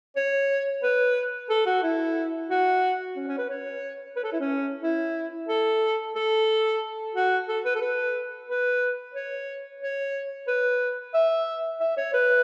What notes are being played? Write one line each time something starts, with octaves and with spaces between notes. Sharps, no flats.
C#5
B4
A4
F#4
E4
F#4
C#4
C#4
B4
C#5
B4
A4
E4
C#4
E4
A4
A4
F#4
A4
B4
A4
B4
B4
C#5
C#5
B4
E5
E5
C#5
B4